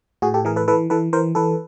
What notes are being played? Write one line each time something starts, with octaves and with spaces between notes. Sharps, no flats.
A2 F#4 G#4
G4 A4
E3 G#4 A#4
A4 B4
E3 A4 B4
E3 A4 B4
E3 A#4 C5
E3 A4 B4